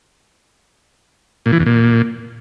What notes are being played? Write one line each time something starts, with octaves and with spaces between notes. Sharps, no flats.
A#2
E3
E2
A#2